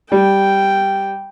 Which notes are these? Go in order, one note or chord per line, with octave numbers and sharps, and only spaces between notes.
G3 G5